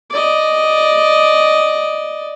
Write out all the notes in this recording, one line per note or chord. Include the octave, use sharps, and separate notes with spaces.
D5 D#5